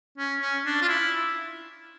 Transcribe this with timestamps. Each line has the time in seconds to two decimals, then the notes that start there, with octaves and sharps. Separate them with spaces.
0.18 C#4
0.41 C#4
0.66 D4
0.81 F4
0.88 E4